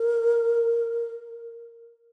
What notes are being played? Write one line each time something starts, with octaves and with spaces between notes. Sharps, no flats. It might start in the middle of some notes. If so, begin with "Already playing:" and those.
Already playing: A#4